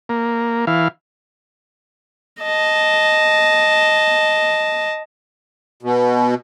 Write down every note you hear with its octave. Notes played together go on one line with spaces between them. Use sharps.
A#3
E3 F5
D#5 A5
B2